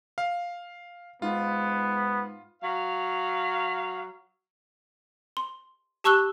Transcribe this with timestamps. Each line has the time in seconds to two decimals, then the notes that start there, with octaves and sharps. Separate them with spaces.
0.18 F5
1.22 G#2 B3 F4
2.62 F#3 F5
5.37 C6
6.04 G4 A5 C#6 E6 F#6 G7